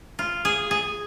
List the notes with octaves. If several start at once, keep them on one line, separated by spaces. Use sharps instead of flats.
F4
G#4
G#4